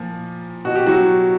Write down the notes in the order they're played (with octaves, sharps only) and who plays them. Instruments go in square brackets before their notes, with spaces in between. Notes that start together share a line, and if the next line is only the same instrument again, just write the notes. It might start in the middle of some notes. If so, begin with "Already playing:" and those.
Already playing: [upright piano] A#2 F3
B2 F#4
G4
F#3 F#4